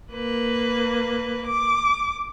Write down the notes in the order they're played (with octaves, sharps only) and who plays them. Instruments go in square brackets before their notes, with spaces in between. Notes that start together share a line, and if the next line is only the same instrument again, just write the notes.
[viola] A#3 B4
D6